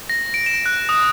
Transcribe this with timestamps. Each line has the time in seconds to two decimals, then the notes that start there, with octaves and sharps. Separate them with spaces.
0.10 A#6
0.34 D7
0.46 E7
0.66 F#6
0.89 D#6